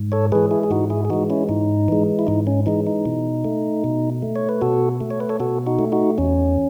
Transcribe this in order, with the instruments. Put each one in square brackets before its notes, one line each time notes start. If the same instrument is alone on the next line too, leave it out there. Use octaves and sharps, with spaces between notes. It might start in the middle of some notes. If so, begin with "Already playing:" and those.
Already playing: [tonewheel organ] G#2
A4 C#5
E3 G#3 G#4 B4
E4 G#4
G#4
G#2 D#4 F#4
E4 G#4
G#4
E3 G#3 D#4 F#4
C#4 E4
G#2 D#4
E3 G#3
E4
G#2 D#4
C#4
E3 G#3 D#4
D#4
B2
A3
B2
A3
C#5
B4
B2 F#4 A4
A3
C#5
B4
A4 C#5
B2 F#4 A4
D#4 F#4
A3
D#4 F#4
E2 C#4